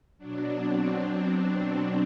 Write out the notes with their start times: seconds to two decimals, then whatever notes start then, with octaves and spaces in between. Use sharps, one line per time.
0.18 B2 F#3 D4
0.62 C4
1.04 D4